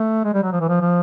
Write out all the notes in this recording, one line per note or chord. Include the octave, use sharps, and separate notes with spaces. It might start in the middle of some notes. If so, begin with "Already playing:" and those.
Already playing: A3
G#3
G3
F#3
F3
E3
F3
F3